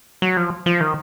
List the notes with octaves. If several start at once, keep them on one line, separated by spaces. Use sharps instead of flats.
F#3
F3
F3
D#3